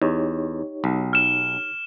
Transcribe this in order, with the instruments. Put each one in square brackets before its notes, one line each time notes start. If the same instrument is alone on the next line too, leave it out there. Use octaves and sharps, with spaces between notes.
[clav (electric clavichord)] E2 [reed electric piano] D#4 G4 C#5
[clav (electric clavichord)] B1
[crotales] F6 E7